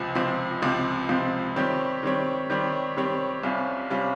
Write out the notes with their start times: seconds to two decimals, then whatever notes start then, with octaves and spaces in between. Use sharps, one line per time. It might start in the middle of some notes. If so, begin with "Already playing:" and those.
Already playing: C#2 C3 F3 C4
0.15 C#2 C3 F3 C4
0.62 C#2 C3 F3 C4
1.09 C#2 C3 F3 C4
1.56 D#3 G3 C4 G4 C#5
2.03 D#3 G3 C4 G4 C#5
2.50 D#3 G3 C4 G4 C#5
2.97 D#3 G3 C4 G4 C#5
3.43 C2 C3 G3 C#4 F4
3.90 C3 G3 C#4 F4